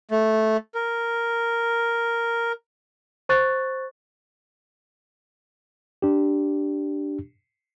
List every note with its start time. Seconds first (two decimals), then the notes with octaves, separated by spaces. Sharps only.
0.11 A3
0.75 A#4
3.29 C5 C#6 F#6 A6
6.02 D4 G4